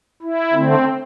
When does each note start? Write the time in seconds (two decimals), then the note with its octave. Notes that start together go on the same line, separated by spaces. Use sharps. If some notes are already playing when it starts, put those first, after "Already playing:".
0.23 E4
0.53 D3 A3 C4